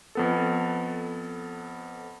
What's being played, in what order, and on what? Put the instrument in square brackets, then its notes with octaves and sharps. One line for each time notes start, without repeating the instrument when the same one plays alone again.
[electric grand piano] F2 B3 A4